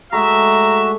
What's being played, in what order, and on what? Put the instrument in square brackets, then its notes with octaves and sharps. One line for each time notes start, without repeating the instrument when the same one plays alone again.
[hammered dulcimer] G#3 A3 D4 [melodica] F#4 [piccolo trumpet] E5 [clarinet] A#5